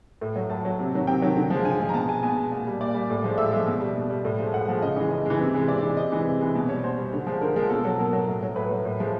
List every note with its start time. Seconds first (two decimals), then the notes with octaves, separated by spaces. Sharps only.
0.21 A2
0.36 F#3
0.50 A2 A5
0.65 F#3
0.79 C3
0.94 D#3 F#3
1.07 C3 G5
1.22 D#3 F#3
1.36 D3
1.50 F3 G#3
1.65 D3 G#5
1.80 F3 G#3
1.89 A#5
1.93 B2 A5
2.08 G#3 G#5
2.23 B2 G#5
2.37 G#3
2.51 A#2
2.67 G3
2.80 A#2 D5
2.94 G3
3.10 A2
3.24 F3 G#3
3.38 A2 E5
3.52 F3 G#3
3.67 B2
3.81 G3
3.96 B2
4.10 G3
4.25 A2
4.39 F3 G#3
4.54 A2 F#5
4.68 F3 G#3
4.82 C#3 D#5
4.96 E3 G#3 D#5
5.11 C#3 D#5
5.26 E3 G#3
5.39 C3
5.54 E3 G#3
5.68 C3 D5
5.82 E3 G#3
5.97 C3 D#5
6.12 E3 G#3
6.26 C3
6.40 E3 G#3
6.55 B2
6.69 G3 C#5
6.84 B2 C5
6.98 G3
7.13 D3
7.27 F3 G#3
7.41 D3 A#4
7.56 F3 G#3
7.69 B2 A4
7.84 F#3 A4
7.99 B2 A#4
8.13 F#3
8.28 A2
8.43 F#3
8.56 A2 B4
8.71 F#3
8.85 A2
9.00 F3 G#3